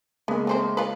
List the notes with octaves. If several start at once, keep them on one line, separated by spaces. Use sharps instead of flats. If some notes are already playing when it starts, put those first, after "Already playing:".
C#3 G#3 A#3 B3
A3 C4 C5
F4 B4